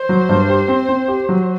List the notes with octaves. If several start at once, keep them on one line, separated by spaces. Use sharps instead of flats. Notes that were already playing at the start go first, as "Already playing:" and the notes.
Already playing: C5
F#3
G2
G4
C4
C4
G4
F#3